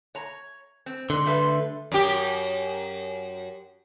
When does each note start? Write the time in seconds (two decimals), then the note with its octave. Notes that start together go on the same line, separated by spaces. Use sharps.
0.15 C#5 A#5
0.86 C4
1.10 G#2 D3 C6
1.26 G3 A3 B4
1.92 F#2 G4